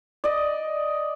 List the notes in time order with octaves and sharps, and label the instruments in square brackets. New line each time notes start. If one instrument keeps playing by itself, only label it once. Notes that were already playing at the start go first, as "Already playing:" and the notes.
[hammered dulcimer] D5 D#5